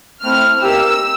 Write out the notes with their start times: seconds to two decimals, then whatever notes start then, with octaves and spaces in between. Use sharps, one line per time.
0.24 A3 C4 E4 F6
0.61 A#3 D#4 G4 E6